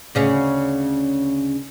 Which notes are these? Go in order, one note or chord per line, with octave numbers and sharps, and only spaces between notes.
D2 C#3 C#4